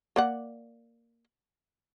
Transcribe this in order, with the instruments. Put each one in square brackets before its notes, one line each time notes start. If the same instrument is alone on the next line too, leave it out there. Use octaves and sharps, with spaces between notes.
[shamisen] A#3 D5 F#5